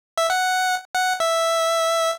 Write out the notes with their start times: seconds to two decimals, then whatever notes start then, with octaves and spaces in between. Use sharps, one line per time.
0.18 E5
0.30 F#5
0.95 F#5
1.20 E5